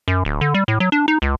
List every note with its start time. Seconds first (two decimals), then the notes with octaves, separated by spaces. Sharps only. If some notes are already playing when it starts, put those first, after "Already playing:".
0.08 F#2
0.25 D1
0.41 D3
0.54 G3
0.68 A2
0.80 F#3
0.92 D4
1.08 D#4
1.22 C#2